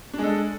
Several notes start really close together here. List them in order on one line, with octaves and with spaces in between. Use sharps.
D4 G#3 A4